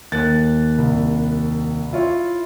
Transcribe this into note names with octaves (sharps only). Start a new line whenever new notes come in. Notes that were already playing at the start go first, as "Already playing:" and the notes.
D#2 F#6 A6
C2
E4 F4 C#5